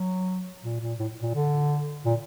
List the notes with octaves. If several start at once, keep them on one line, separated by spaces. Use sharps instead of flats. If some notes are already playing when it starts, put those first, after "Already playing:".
Already playing: F#3
A#2
A#2
A2
A#2
D3
A#2